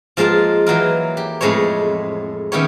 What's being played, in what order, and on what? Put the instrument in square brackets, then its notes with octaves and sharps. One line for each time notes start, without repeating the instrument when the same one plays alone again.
[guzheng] F3 G#3 A#3 F4 A5
E3 F#3 A#3 A#4
G4
F2 A2 G#3 C5 C#5
D#3 B3 C#4 E4 G4 C#5